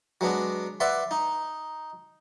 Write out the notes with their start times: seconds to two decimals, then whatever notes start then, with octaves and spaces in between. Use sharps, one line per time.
0.21 F#3 G#3 B3 D4
0.80 B4 D5 E5 F#5 C6
1.11 D#4